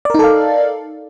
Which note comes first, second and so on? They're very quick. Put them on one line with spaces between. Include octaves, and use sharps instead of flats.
D5 A#4 D#4 A4 F5